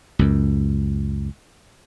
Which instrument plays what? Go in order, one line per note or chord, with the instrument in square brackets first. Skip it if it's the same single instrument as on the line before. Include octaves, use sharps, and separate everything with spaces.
[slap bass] C#2 F#2